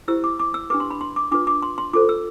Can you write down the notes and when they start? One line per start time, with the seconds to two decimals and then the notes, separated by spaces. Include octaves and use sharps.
0.08 E4 G4 C5 E6
0.24 D6
0.39 D6
0.54 E6
0.70 D4 G4 B4 D6
0.80 C6
0.91 B5
1.01 C6
1.16 D6
1.31 D4 F4 B4 D6
1.47 D6
1.62 C6
1.78 C6
1.93 F4 A4 C5 D6
2.09 E6